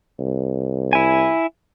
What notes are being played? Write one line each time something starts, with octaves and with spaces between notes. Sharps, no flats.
C2
E4 G#5